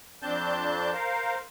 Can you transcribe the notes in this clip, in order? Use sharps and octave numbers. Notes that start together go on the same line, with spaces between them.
F2 C4 D4 A5 G6
A#4 C5 F5